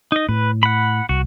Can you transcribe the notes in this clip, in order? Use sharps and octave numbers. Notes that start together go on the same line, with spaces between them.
D#4 D#5
A2 B4
F#5 B5
C2 F#4